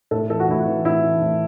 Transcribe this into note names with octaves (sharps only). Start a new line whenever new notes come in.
A2 A4
E3 A4
F#4
A2 E4
F#4
E3
A2 E4
E3
A2